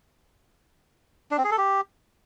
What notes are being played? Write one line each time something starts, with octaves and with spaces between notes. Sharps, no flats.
D4
C4
G#4
A4
G4